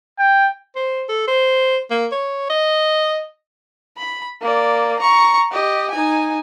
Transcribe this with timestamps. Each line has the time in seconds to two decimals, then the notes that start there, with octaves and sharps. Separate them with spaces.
0.19 G5
0.76 C5
1.09 A4
1.28 C5
1.91 A#3
2.12 C#5
2.50 D#5
3.97 B5
4.42 A#3 D5
4.99 A#5 C#6
5.52 G4 D#5
5.91 D#4 G#5